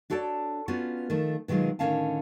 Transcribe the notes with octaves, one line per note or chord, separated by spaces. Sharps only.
D4 F#4 A4 C#5 D5
B3 C#4 D4 F4 F#4
D#3 F3 A3
B2 D#3 F#3 G#3 F4
A2 D3 D#3 C#4 F5 A5